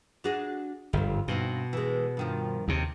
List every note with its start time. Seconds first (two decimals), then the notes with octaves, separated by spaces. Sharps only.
0.24 D4 F#4 G#4
0.93 G1 F2 G#2
1.28 G2 B2 C4 D#4
1.73 E3 G#3
2.17 G2 D#3 F3
2.68 D#2 C3